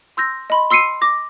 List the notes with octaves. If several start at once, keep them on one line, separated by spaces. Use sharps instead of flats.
C6 E6 G6 A#6
D#5 B5 C6
C6 E6 C7 C#7 D#7
D6 A#6